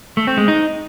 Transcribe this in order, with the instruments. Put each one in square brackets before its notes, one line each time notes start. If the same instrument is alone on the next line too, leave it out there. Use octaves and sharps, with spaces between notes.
[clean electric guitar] A3
C4
G#3
D#4